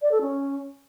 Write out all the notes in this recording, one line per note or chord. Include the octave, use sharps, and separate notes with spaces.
D5
A4
C#4